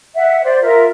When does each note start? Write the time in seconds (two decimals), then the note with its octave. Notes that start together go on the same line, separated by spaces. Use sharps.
0.15 E5 F#5
0.43 C5 D5
0.62 F4 A#4 E5